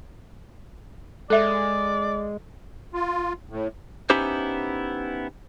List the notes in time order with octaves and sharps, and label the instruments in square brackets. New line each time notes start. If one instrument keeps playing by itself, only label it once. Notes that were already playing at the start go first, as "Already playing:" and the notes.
[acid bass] G#3 [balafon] A4 E5 [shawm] D5
[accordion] F4
A2
[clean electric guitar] B3 C#4 D#4 E4 G4 C5